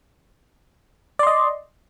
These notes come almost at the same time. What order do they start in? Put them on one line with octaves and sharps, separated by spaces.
D5 C6 D#5